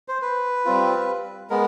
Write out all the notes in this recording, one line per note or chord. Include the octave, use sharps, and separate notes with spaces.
C5
B4
G3 C4 F4
G#3 B3 A#4